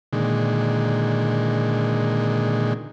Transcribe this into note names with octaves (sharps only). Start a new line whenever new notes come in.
A#2 D3 D#3 G#3